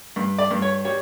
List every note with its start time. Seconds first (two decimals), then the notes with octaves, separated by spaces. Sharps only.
0.16 G2
0.38 D5
0.51 G2
0.62 C#5
0.85 G3 C#5